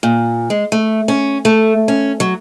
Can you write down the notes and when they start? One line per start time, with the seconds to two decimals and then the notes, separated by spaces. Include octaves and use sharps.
0.03 A#2
0.50 G#3
0.72 A3
1.08 C#4
1.45 A3
1.88 C#4
2.20 F#3